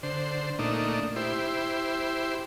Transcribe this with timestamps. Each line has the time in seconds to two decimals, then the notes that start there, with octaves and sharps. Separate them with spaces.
0.03 D3 C5
0.59 A#2 A3 D4 D#4
1.16 E4 G4 C5